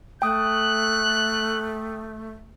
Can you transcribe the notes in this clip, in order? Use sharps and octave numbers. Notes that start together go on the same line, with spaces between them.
A3 G5 D#6 F#6